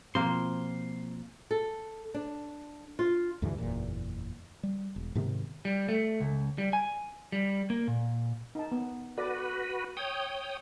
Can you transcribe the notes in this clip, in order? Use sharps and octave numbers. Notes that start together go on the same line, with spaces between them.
B2 F3 A#3 C4 C5 C6
A4
D4
F4
D2 G2 D3 E3
F#1 E2 A#2
G3
E1
G#2 C3 D#3 B3
G3
A3
C#2
G3
G#5
G3
A#3
A#2
D#4 A5
B3
F#4 A4 B4 D5
C#5 G5 D#6